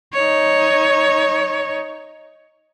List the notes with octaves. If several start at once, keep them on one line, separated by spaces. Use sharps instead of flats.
D#4 C#5